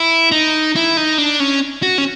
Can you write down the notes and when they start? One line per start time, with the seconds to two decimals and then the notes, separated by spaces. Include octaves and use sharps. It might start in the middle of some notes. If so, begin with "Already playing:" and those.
Already playing: E4
0.31 D#4
0.76 E4
0.97 D#4
1.18 D4
1.40 C#4
1.83 F#4
1.98 C#4